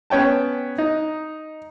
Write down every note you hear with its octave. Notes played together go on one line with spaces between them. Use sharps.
B3 C#4 C#5 G5 A5
D#4